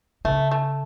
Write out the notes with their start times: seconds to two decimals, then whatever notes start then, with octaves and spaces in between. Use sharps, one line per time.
0.25 C#3 A3
0.51 A3